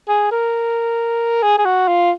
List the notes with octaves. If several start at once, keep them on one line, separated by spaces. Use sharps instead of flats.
G#4
A#4
G#4
G#4
F#4
F4